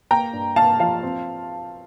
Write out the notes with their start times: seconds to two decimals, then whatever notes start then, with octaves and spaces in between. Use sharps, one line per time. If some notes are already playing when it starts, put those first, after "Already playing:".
0.11 A#3 G5 A#5
0.33 G2
0.56 A#3 F5 A5
0.80 F3 F5 A5
1.03 C4